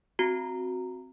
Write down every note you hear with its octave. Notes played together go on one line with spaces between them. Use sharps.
C4 F#4 A#5